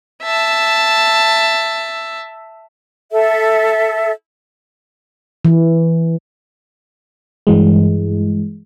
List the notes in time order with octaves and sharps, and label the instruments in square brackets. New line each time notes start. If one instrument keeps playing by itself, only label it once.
[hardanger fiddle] E5 A5
[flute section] A4 E5
[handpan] E3
[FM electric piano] G2 E3 G#3